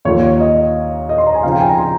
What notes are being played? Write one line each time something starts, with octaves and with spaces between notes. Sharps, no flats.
D#2 D#3 A#3 F4 C#5
D#5
D#5
C6
A#5
G#5
C#3 F3 C4 D#4 F5
G5
G#5
A#5
C6